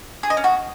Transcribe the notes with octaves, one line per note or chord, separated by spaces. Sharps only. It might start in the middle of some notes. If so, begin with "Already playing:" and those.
G#4
D#5
C#4
F#4